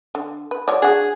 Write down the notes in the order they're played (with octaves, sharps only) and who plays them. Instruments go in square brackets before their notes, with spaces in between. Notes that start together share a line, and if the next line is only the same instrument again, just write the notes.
[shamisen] D3
B4
F#3 C#5 D5
[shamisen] D4 F#4 [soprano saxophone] G#4